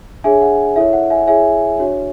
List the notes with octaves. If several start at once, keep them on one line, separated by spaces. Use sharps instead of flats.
D4 G#4 C#5 E5 G#5
F#5
E4 A4 C#5 E5
F#5
E5 G#5
E4 G#4 C#5 E5 G#5
D4 F#4 C#5